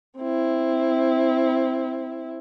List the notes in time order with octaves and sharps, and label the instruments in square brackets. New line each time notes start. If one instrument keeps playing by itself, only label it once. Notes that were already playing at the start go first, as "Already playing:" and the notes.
[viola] C4 E4